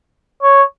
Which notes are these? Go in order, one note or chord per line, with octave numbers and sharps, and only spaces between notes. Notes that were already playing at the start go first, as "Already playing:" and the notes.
C#5